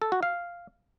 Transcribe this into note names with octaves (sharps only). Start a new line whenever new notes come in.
A4
F#4
F5